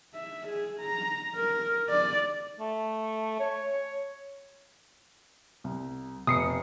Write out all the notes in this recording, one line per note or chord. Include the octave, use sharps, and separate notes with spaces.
E5
G#4
A#5
A#4
D5
A3
C#5
C#5
C2
F1 D#6 C7 C#7